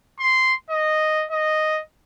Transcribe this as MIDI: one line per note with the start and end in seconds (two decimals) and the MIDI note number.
0.20 0.54 84
0.70 1.26 75
1.31 1.81 75